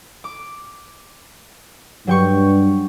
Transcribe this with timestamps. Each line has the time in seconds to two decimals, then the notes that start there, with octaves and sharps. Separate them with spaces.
0.24 D6
2.07 G2 F#3 G5 C#6